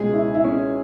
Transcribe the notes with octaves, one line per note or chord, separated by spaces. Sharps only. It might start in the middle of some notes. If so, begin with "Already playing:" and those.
Already playing: C#2 B2 G#3 C#4 G#4
E4
E4
C#4